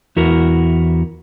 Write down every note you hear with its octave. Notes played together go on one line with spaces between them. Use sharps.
E2 E4 F#4 A#4